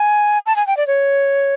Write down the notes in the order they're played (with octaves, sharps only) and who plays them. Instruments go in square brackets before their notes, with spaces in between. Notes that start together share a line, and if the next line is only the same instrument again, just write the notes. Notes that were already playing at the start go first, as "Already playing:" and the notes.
Already playing: [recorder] G#5
A5
G#5
G5
D5
C#5